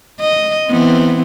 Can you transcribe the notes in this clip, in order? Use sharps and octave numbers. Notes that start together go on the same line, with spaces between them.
D#5
E3 B3 C4